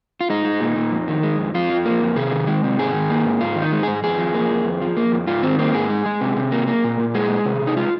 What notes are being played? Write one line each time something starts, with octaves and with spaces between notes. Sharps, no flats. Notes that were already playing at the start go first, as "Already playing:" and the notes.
F4
G#3 D#4
G#3
A#2
A#2
F2
D#3
G#3
F2
F2 F4
F3
A#3
F2
C3 G#4
D#3
G#3
C3
G#2 G#4
D#3
A#3
G#2
G#2 F4
D#3
D#4
G#3
G#2 G#4
F2 G#4
F3
A#3
F2
F2
F3
A#3
F2
G#2 F4
D#3 C4
A#3 C4
G#2 G#4
G#3
G#3
C3
C3
A#3
A#3
A#2
A#2
G#3 G#4
G#3
C3
C3
D#4
G#3 F4